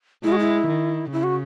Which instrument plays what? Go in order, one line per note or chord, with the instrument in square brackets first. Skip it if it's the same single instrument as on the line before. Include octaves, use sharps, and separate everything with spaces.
[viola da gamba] G#3 [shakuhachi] E4
[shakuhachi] F#4
E4
[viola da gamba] D#3
[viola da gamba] C#3 [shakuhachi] E4
[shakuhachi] F#4